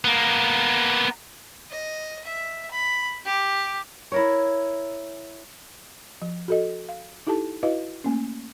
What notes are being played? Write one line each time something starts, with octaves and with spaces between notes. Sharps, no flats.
A#3 B3
D#5
E5
B5
G4
E4 A#4 C#5
F3
F#4 A4 D#5
F5
D#4 E4 G4 A4 A5
E4 F#4 B4 D#5 F5
A3 A#3 C#4